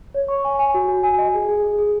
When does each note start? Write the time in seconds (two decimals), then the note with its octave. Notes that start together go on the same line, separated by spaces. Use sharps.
0.14 C#5
0.28 C#6
0.45 G#5
0.59 G#5
0.74 F#4
0.88 F#4
1.03 G#5
1.18 D#5
1.34 G#4
1.49 G#4
1.63 G#4
1.78 G#4